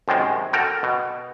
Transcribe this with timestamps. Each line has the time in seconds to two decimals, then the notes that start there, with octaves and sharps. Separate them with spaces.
0.08 F#2 C3 D#3 G#3
0.53 F#4 A4 A#4 G5
0.83 B2